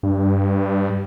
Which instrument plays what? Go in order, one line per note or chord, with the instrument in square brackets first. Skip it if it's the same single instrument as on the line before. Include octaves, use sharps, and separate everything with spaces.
[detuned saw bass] G2